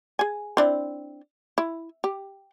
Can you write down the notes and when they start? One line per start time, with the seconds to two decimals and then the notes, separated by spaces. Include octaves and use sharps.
0.19 G#4 G#5
0.57 C4 D4 E4
1.58 E4
2.04 G4